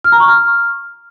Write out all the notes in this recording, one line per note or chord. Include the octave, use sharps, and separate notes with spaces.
F6
A#5
C#6
F6